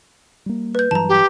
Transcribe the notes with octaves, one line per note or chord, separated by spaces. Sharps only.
G3 A#3
B4 G6
G2 E3 F#3 A5 A#5
G4